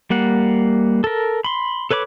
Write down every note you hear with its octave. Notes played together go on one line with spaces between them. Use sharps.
G3 A#3 F#5
A4 A#4
B5 C6
A4 B4 C#5 B5 D6